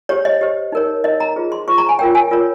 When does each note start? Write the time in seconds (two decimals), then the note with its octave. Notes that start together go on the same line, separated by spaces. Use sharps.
0.09 G4 C5 C#5
0.25 D#5
0.41 G4 C5
0.72 D#4 A#4 C#5
1.04 D#4 A#4 C#5 D#5
1.20 A#5
1.36 F4 G#4 C5
1.52 C6
1.68 F4 G#4 C5 C#6
1.78 A#5
1.89 G#5
1.99 F4 A#4 C#5 G5
2.15 G#5
2.31 F4 A#4 C#5